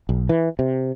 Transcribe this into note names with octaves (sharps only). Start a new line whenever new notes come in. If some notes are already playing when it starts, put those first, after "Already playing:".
B1
E3
C3